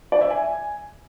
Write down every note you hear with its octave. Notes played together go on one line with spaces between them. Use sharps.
D5
E5
G#5